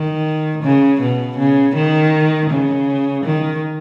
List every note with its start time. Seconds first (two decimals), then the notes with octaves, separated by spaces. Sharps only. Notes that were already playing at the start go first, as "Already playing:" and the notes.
Already playing: D#3
0.63 C#3
1.01 B2
1.37 C#3
1.75 D#3
2.50 C#3
3.24 D#3